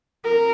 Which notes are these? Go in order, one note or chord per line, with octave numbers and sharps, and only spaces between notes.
A#4